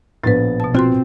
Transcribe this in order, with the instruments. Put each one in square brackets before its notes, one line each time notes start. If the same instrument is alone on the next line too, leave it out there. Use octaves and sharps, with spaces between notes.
[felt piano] A#1 B3 A6 [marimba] A2 B4
[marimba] B2 A5
[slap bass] C4 [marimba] F4 F#4 C6